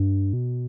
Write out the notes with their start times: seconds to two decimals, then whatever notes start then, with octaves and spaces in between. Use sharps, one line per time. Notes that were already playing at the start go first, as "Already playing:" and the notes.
Already playing: G2
0.33 B2